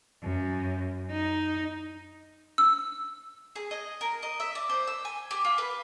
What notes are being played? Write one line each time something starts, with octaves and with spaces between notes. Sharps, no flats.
F#2
D#4
E6
G#4
D#5
A#4
D#5
E5
D5
C5
E6
G#5
G4
F4
B4